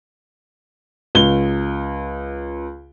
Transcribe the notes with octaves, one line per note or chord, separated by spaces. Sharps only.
C#2 G7